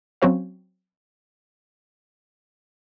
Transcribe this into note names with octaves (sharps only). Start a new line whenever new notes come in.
F#3 C4 C#4 F#4 C5 F5